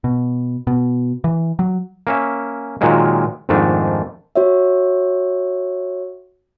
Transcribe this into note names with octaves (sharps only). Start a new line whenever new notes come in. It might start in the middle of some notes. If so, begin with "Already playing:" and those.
B2
B2
E3
F#3
A#3 C#4 E5
A#2 D#3 F#3 G#3 A#3
F2 G#2 D#3 A3 D4
F#4 C#5 E5